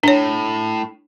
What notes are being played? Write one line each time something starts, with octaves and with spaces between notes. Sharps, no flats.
A2 D4 C#5